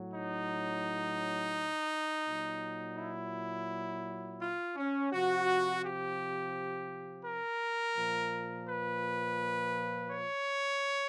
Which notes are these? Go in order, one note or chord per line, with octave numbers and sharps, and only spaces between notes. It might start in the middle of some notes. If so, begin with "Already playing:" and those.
Already playing: A2 F#3
D#4
A#2 F#3
E4
F4
C#4
C3 F3 F#4
G4
A#4
A#2 F3
B4
C#5